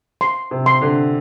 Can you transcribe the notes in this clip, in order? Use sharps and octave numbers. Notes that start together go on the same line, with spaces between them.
C6
C3
C6
D3